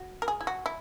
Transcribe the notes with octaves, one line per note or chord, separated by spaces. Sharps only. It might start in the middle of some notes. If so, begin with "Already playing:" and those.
Already playing: F#4
A#4
G#4
E4
F#4
E4